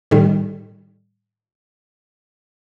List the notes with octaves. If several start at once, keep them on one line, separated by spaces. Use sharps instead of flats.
A2 D#3 G3